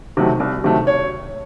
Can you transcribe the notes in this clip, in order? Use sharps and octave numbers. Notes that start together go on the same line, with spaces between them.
C3 D#3 F#3 A3
C2
C3 D#3 F#3 A3
C#5